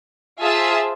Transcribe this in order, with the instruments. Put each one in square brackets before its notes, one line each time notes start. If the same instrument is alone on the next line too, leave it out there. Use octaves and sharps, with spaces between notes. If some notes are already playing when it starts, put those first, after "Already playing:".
[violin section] F4 G#4 C5 E5 A5